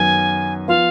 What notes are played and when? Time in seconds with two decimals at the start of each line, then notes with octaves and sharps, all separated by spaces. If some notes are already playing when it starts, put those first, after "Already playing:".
Already playing: F#2 D#3 F#3 B3 G#5
0.68 F3 B3 F4 F5